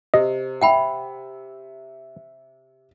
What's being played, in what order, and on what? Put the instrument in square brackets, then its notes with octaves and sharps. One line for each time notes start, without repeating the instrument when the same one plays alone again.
[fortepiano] C3 [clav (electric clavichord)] D#5
[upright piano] E5 [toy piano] F#5 G5 B5